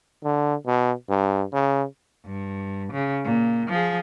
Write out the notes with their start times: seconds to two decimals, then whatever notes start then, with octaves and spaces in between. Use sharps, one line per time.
0.24 D3
0.66 B2
1.09 G2
1.53 C#3
2.25 G2
2.93 C#3
3.24 A#2
3.70 F3 G#4